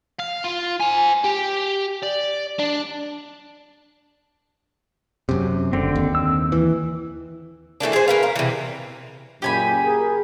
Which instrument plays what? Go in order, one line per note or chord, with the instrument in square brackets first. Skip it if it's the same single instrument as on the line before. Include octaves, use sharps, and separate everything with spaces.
[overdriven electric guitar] F5
F4
C5 G#5
G4
D5
D4
[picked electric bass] F#2 C3
[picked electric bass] F#1 [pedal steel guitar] D3 C4
[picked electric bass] D#2
[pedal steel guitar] E6
[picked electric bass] E3
[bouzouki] E3 A3 A#3 D4
G#4 C5
A#4 B4 F5
A#4
C3 E3
[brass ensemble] F#2 A#2 C#3 [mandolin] G4 G#5 B5
[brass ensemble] G#4 A#4